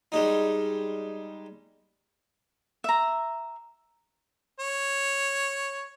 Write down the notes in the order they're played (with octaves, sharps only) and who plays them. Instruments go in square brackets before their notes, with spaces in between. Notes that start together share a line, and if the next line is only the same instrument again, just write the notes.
[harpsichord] G3 G#3 D#4
[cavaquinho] E5 A#5
[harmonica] C#5